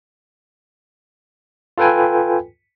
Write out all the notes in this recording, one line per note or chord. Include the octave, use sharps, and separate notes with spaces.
F4 A4 B4 G5 G#5